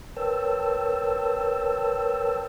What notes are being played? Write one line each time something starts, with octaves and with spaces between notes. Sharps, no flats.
A#4 B4 C#5 G5 A5 E6